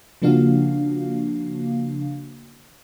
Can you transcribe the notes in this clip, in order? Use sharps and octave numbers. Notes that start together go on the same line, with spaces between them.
C#3 F3 A#3 D4 F#4 F5